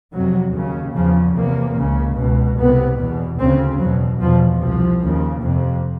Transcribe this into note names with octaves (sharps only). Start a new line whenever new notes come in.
F2 C3 F#3
D#2 C#3
E2 C#3 F3
E2 C3 A#3
C#2 C#3
C#2 B2
C2 C3 B3
E2 B2
D2 C#3 C4
E2 B2 F#3
E2 B2 F3
C2 C3 F3
D#2 C#3
F2 C3